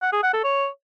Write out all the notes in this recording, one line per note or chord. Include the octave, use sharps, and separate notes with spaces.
F#5
G#4
F#5
A4
C#5